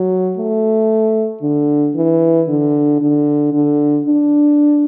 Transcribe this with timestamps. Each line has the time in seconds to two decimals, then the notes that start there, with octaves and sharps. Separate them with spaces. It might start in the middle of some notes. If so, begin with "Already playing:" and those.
Already playing: F#3
0.37 A3
1.42 D3
1.95 E3
2.48 D3
3.00 D3
3.53 D3
4.06 D4